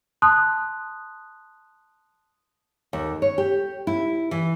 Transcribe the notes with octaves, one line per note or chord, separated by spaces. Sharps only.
A5 C6 D#6 F#6
D#2
C#5
G4
E4
E3